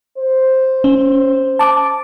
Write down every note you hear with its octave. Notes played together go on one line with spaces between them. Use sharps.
C5
C#4
A5 D6